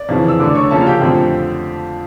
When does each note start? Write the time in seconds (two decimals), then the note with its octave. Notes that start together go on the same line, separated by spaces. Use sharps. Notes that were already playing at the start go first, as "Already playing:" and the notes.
Already playing: D5
0.09 F2 C#3 E3
0.28 E6
0.39 D3 A3 D4 D5 D6
0.55 C#5 C#6
0.71 C#3 F3 A#3 C#4 A4 A5
0.80 F5
0.86 G4 G5
1.02 F2 D3 F3 A3